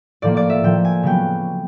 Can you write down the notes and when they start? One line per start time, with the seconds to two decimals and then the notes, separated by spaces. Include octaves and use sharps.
0.22 A2 F3 A#3 D5
0.37 D5
0.50 E5
0.63 A2 F3 A#3 G5
0.85 G#5
1.03 C#3 F#3 B3 G5